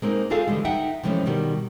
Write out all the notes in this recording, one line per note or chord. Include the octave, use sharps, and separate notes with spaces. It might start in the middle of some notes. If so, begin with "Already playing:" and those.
G#3 A#3 C4 D4 D#4
C4 D#4 F4 G#4 A4 F5
D3 E3 G3 G#3
D#4 E5 F#5 G5
C3 E3 F3 G#3 A3 C#4
B2 D#3 G3